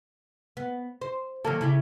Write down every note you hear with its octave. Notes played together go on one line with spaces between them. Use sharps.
B3
C5
D#3 F#3 A#3 A4
C#3 E4 G4